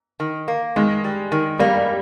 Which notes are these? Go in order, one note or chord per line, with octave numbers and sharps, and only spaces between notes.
D#3
A#3
D#3 G#3
G3
D#3
G3 A#3